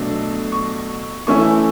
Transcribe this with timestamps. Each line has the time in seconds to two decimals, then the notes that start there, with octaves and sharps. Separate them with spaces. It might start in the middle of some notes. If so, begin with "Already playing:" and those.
Already playing: B2 F#3 A3 D4
0.52 C#6
1.27 E3 A3 C#4 E4 C#6